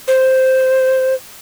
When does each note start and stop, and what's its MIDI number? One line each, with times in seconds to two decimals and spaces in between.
0.08 1.15 72